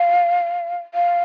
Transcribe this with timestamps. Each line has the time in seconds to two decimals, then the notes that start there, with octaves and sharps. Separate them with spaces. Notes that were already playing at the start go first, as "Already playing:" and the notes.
Already playing: F5
0.94 F5